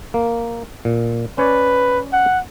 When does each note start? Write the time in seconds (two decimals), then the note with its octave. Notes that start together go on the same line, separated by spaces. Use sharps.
0.14 A#3
0.85 A#2
1.38 C#4 B4 C#5 D5
2.13 F#5